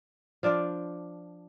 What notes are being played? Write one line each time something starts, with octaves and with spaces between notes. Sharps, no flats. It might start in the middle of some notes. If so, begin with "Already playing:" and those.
F3 D4 F4 D5